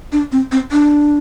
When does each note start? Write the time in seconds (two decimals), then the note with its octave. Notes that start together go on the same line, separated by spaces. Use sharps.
0.12 D4
0.32 C4
0.52 C4
0.72 D4